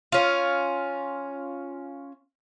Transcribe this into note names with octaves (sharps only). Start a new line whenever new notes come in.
C#4 F4